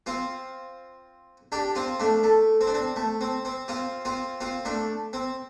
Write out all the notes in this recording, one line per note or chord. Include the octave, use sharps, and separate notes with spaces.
C4 F4
D4 G4
C4 F4
A3 D4
A3
C4
D4
C4
A3
C4
C4
C4 F4
C4 F4
C4 F4
A3 D4
C4